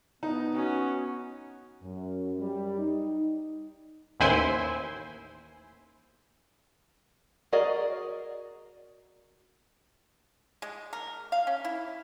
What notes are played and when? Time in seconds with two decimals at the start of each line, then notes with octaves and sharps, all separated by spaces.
0.23 B3 D#4
0.55 C#4 F#4
1.82 F#2
2.39 G3
2.78 D#4
4.20 A1 D#2 E4 C5 G#5 C6
7.52 F#4 G#4 A#4 D5 D#5
10.62 G#3
10.93 A#4
11.32 F5
11.47 C#4
11.64 E4